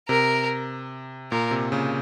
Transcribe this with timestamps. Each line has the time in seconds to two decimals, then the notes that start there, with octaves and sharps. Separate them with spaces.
0.09 C3 A#4
1.31 A#2 A#4
1.51 C3
1.72 A#2 C#3